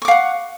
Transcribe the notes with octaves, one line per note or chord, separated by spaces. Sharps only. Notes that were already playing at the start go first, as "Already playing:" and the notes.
F5 F#5 C#6 D6